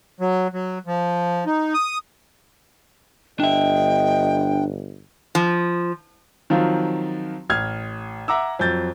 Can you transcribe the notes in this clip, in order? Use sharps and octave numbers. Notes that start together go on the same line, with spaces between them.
F#3
F#3
F3
D#4
D#6
G1 D4 D#5 E5 G5
F3
D#3 F3 F#3 C4 F4
A1 F6 G#6
E5 F#5 A#5 D6 E6
F2 F#3 G6 A6